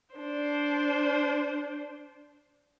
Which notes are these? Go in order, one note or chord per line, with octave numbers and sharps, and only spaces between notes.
D4 C5